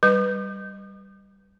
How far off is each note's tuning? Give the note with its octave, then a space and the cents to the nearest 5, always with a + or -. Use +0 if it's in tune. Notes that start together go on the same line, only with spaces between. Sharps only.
G3 +0 B4 +0